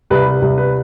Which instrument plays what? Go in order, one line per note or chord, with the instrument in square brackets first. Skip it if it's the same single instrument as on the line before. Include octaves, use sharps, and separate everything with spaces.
[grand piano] C2 B4
C2
B4